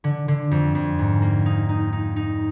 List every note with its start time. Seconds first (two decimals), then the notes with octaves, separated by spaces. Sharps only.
0.04 D3
0.28 D3
0.51 F2
0.75 F2
0.99 G#2
1.22 A#3
1.46 D#4
1.69 D#4
1.93 D#4
2.16 D#4